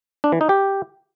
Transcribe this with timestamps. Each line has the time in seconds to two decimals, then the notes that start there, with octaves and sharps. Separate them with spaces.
0.24 D4
0.32 E3
0.41 D#4
0.49 G4